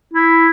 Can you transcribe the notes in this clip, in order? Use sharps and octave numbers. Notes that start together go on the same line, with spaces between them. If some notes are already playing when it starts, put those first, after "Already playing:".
E4